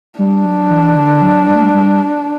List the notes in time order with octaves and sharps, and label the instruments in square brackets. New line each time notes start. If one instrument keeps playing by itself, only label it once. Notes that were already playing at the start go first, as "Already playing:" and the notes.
[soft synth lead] G3 [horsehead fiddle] D4
[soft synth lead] F#3
E3
D3
F#3
G3
A3
G3
G3